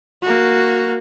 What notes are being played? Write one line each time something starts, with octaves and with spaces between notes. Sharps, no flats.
A#3 F#4